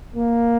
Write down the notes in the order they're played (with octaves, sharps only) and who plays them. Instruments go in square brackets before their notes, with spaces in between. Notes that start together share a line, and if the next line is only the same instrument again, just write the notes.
[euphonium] A#3